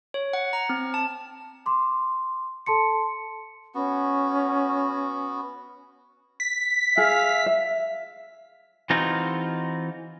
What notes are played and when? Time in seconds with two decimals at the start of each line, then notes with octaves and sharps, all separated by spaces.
0.14 C#5
0.33 F#5
0.53 A#5
0.69 C4
0.94 A5
1.66 C6 D6
2.66 A4 A5 C6 C#7
3.75 B3 C#4 F#4
6.40 B6
6.97 G#4 E5 F5
7.46 E5
8.90 E3 C4 D#4 F4 F#4 G#4